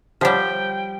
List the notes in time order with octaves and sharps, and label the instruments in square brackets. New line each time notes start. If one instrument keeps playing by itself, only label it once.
[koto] F3 G3 [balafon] G4 C#5 F#5 [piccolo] G5